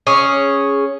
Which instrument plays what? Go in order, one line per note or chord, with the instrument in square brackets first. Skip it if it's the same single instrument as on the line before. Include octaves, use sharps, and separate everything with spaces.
[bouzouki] C#4 G#4